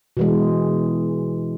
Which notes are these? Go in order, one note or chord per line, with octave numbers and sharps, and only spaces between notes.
B2 E3 G#3